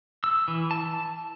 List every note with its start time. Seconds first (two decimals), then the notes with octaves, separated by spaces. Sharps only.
0.24 E6
0.48 E3
0.71 A5